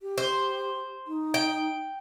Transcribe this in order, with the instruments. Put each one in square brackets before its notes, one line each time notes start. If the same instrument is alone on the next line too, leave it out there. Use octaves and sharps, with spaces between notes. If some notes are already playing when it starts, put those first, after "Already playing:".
[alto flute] G4
[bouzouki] C5
[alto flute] D#4
[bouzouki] G5